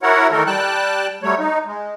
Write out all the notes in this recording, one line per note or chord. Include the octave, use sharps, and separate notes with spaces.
E4 F#4 A#4 C#5 F#5
D#3 E3 A3 A4 A#4
G3 G5 A5 F#6
F#3 G3 A3 C#5
D#4
G#3